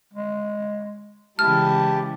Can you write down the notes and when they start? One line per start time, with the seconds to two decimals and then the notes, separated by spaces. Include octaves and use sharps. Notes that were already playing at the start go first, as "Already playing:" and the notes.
0.13 G#3
1.39 C#3 E3 G#3 E4 G4 A5 F6